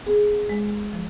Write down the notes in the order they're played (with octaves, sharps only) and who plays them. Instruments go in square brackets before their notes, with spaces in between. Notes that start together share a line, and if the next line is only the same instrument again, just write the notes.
[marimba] B3 G#4
G#3
F3